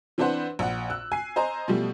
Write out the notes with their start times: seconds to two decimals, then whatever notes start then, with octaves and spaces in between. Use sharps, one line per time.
0.18 E3 C4 D4 B4 C5 F#5
0.59 A#1 F#5
0.90 E6 F#6
1.12 G#5 C7
1.36 C5 D#5 G#5 A#5
1.68 B2 F3 G3 A3